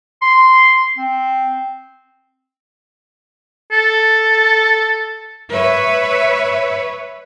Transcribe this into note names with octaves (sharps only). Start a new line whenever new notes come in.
C6
C4
A4
B4 C#5 E5